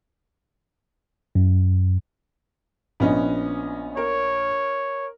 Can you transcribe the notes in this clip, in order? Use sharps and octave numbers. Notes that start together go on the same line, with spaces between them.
F#2
A#1 B3 C#4 D#4
A#4 C#5